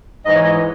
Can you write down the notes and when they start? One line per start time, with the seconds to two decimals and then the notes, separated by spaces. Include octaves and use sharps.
0.25 G#2 E3 D#5
0.35 C#5
0.45 D#5